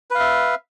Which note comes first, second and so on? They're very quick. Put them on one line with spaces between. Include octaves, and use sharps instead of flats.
B4 F5 E5